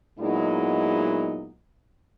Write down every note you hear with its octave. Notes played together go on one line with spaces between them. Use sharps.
A#2 F#3 G#3 B3 D#4 E4